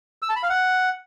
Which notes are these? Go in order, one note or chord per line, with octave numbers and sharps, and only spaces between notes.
E6
A5
B5
F5
F#5